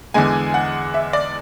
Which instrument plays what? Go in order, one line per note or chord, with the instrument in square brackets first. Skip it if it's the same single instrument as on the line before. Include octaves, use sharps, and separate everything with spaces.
[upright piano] E2 D3 G#3 G#5
F#5
E5
D5